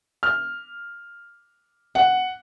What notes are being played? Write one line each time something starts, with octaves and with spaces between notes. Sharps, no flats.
F6
F#5